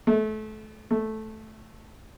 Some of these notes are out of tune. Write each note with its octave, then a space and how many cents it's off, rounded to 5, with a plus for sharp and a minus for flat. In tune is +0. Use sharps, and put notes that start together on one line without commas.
A3 -30
A3 -10